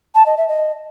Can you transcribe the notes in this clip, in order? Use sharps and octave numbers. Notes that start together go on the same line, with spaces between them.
A5
D#5
E5
D#5